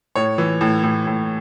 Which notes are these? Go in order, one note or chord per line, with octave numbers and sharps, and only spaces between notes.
A2 C#5
E3
A2
A2
A2